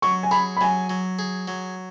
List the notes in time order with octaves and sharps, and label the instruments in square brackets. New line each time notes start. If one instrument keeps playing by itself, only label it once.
[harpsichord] F#3 [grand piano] C#6
[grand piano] G#5
[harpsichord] G#4 [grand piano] B5
[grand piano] B5
[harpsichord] F#3 [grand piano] G#5
[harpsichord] F#3
G#4
F#3